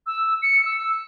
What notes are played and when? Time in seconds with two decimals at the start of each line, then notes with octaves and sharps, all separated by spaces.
0.07 E6
0.42 C#7
0.65 E6